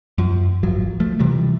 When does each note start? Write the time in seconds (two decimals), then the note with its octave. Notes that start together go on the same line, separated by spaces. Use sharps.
0.18 F#2 F3
0.63 D1 G#1 F3 F#3
1.00 F3 A3
1.19 C3 E3 F3 G3